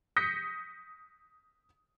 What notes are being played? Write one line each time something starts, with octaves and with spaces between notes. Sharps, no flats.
D#6 G6 A#6 B6 C#7